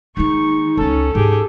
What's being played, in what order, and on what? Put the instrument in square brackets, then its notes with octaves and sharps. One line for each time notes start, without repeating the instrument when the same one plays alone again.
[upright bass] D#3 A#3 [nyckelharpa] G#3 C#6 [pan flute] D#4
[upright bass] C#2 A#3 [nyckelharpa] C#4 [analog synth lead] A4
[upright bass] G#2 [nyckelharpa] G4 G#4